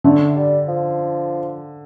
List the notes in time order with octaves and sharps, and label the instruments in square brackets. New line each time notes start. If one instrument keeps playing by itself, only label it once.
[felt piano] D3 [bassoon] A3
[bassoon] G3
F3